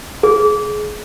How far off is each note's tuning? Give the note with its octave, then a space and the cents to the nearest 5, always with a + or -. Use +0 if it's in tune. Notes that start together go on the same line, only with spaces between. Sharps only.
G#4 +20